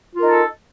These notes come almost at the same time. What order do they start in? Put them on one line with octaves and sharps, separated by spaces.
F4 A#4 D#4 A4